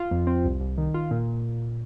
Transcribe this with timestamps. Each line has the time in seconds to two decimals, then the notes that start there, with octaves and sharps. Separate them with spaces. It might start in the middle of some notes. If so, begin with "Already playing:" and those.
Already playing: F4
0.11 F2
0.27 C4
0.45 C2
0.61 C2
0.78 D#3
0.94 F4
1.11 A#2